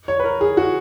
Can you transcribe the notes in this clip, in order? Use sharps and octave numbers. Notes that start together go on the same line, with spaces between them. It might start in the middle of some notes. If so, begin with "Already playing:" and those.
C#5
B4
A#4
G#4
F#4